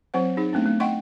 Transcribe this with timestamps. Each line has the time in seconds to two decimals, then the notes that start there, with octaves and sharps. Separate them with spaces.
0.14 F#3 C4 C5 F#5
0.37 D#4 G#4
0.53 A3 B3 C4 D4
0.66 A3
0.80 D#5 F#5 G5 C6 C#6